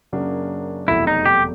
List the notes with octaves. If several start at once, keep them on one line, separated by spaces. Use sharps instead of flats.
F#2 C#3 F#3 A#3 D4
F1 E2 B2 F#3 A3 E4
D#4
G4